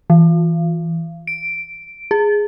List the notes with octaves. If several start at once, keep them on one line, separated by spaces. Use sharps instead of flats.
E3
D7
G#4